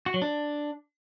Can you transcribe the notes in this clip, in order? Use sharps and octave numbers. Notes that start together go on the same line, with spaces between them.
F#4
F#3
D4